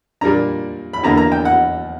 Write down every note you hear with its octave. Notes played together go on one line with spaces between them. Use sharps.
A#2 G3 A#3 D4 A#5
B5
E2 D3 A#3 A#5
A#5
G5
F#5